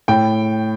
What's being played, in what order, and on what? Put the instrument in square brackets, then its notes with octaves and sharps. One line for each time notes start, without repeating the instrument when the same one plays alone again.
[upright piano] A2 G5